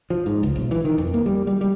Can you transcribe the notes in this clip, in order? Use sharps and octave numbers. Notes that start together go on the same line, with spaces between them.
F3
G#2
C#2
B1
E3
D#3
F2
A#3
G3
G3
G3